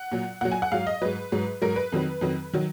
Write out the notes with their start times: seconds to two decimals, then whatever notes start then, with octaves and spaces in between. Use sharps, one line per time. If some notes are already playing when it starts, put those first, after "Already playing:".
Already playing: F#5
0.12 A#2 F#3
0.41 A#2 F#3 F#5
0.51 G#5
0.62 F#5
0.72 G#2 F#3 F5
0.87 D#5
1.02 G#2 F#3 B4
1.32 G#2 F#3
1.62 G#2 F#3 A#4
1.76 B4
1.92 F2 D#3 F#3
2.21 F2 D#3 F#3
2.53 D#3 F#3